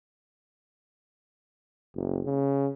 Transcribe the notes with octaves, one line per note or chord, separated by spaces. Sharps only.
F#1
C#3